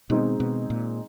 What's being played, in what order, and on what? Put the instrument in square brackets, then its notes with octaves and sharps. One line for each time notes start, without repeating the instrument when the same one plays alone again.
[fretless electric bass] B2 [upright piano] D#3 G#3 C4 D#4 G#4
[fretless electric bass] B2
A#2